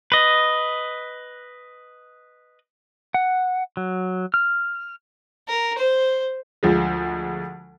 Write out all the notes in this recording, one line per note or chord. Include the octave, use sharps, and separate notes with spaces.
B4 D#5
F#5
F#3
F6
A#4
C5
D2 F3 G#3